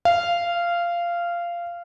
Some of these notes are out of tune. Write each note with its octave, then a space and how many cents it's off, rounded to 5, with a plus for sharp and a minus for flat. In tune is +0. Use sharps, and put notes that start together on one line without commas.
F5 -15